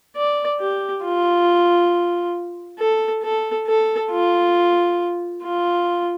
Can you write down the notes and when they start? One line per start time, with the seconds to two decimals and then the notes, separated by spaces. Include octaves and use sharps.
0.16 D5
0.60 G4
1.04 F4
2.79 A4
3.23 A4
3.67 A4
4.11 F4
5.43 F4